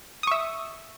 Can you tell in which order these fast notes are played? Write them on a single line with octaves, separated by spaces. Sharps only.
D#6 C#6 E5